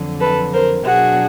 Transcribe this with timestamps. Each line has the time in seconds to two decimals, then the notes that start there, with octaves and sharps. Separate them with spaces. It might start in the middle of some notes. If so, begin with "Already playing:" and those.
Already playing: F2 D3 F#3
0.20 A4 B4
0.53 A#4 C5
0.85 B2 F#3 B3 D4 F#4 G#4